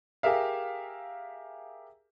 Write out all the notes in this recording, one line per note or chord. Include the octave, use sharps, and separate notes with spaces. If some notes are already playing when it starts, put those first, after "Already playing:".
G4 G#4 A#4 E5 F5